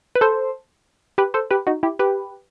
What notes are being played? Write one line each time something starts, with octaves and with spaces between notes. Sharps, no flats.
B4
A4 C5
G4 B4
A4 C5
G4 B4
D#4 F#4
E4 G4
G4 B4